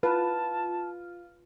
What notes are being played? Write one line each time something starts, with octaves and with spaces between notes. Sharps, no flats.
F4 B4 A5